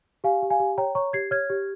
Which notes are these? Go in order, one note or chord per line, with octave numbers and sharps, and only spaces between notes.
G4 F5 G#5
G4
F5 G#5
G4
C#5 G5 A#5
C#5 A#5 C#6
G4 G#6 C7
C#5 F6 G#6
G4